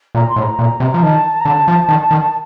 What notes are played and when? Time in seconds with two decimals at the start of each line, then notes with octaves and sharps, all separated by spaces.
0.15 A#2 A#5
0.29 C6
0.36 A2
0.43 A#5
0.59 A#2
0.80 C3
0.94 F3
1.02 D#3 A5
1.41 A#5
1.45 D3 A5
1.68 F3
1.89 D#3
2.11 D#3